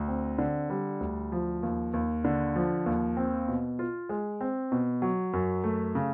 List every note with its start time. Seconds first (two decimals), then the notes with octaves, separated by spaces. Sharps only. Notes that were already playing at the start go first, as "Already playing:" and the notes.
Already playing: D2
0.08 C4
0.38 D3
0.70 G3
1.00 D2
1.32 F3
1.63 D#2
1.94 D#2
2.25 D3
2.56 F3
2.86 D#2
3.17 C4
3.48 B2
3.79 F4
4.09 G#3
4.41 C4
4.72 B2
5.02 F#3
5.33 F#2
5.64 A3
5.95 C#3